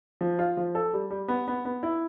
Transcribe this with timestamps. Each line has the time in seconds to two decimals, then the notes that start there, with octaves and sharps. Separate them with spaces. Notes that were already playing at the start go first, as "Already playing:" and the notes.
0.21 F3
0.39 F4
0.57 F3
0.75 A4
0.93 G3
1.10 G3
1.28 B3
1.48 B3
1.65 B3
1.83 E4